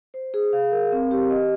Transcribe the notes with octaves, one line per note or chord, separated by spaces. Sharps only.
C5
G#4
F5
A#4
C4
G4
D#5